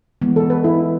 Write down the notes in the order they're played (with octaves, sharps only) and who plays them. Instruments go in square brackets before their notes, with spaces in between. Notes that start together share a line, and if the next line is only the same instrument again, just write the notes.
[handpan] E3 G#3 B3
[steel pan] A4
B4
E4